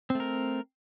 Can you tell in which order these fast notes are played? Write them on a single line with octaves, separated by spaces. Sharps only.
C4 A3 A#4